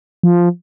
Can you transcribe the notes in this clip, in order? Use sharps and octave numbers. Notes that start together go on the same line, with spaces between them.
F3